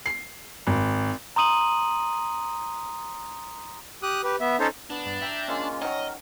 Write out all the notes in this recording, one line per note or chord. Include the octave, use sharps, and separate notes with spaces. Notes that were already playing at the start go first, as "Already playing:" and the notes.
C7
G#1
A#5 C6 D#6 D#7 F#7
G4 D#6 F#6
G4 B4
B3 E5
C#4 D#4 A4 C5 C#5
B3 D4
G2
E5 G5 A#5
G#3 A#3 C#4 F4
D#3 F#3 A#4 D#5